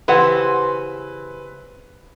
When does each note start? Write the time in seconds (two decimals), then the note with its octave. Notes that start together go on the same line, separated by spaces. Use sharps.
0.08 C#3 E3 C4 E4 G4 B4 F#5